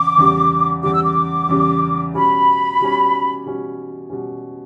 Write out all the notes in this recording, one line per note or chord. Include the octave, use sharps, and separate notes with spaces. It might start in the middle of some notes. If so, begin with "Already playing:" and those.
Already playing: E2 C#3 D6
E2 C#3 G3
E2 C#3 G3 D6
E6
D6
E2 C#3 G3
B2 G3 C#4 B5
B2 G3 C#4
B2 G3 C#4
B2 G3 C#4